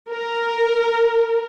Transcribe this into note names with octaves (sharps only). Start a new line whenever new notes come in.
A#4